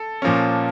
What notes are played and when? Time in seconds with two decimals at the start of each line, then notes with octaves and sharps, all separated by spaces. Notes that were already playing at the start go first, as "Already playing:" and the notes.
Already playing: A4
0.22 A#2 F3 A#3 C#4